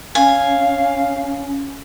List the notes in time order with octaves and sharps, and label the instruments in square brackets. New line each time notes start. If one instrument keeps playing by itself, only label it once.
[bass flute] C#4 [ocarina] F5 [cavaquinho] G#5